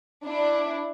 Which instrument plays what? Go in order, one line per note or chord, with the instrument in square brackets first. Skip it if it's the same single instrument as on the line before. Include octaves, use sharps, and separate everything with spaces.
[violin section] D4 E4